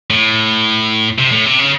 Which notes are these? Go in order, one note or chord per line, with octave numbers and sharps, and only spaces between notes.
A2
C3
A2
C3
C#3